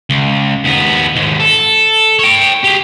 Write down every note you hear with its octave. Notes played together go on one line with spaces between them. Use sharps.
C#2
D#2 B3
D#2 G#2
A4
C#5 G5
G4 G#4